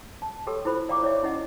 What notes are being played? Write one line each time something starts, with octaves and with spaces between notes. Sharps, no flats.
A5
G4 A4 C#5 G5 C6 E6
E4 F4 A4 C5 B5
D5 F5 G5 A#5 C#6 D6
E4 C#5 D5 E5
C#4 E4 D#5 F#5